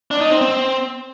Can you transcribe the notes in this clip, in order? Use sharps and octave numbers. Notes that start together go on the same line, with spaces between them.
D4
D#4
C4
C4